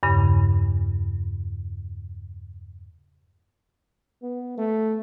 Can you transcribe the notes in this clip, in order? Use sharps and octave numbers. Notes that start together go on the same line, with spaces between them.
E2 G2 C#3
B3
A3